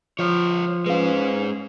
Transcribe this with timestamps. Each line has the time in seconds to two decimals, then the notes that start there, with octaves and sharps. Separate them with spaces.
0.19 F3 F4 C#5
0.86 G#3 C#4 B4 C5 F5